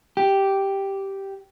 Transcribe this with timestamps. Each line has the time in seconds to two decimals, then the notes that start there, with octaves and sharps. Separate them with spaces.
0.17 G4